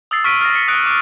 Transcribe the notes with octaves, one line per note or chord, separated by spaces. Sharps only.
D#6 E6 A6 C7
C#6 F6 B6 D7 D#7
F6 A#6
A#6 C#7
D#6 F#6 B6 D7
D6 D7